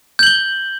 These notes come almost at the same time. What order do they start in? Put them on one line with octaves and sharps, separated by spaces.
G6 F#7 G7